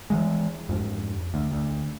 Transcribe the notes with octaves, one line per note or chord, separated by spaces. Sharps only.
E3 F3 G#3
F2 G#2
D2
D2